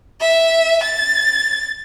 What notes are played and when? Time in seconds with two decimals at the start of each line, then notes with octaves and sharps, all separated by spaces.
0.21 E5
0.83 A6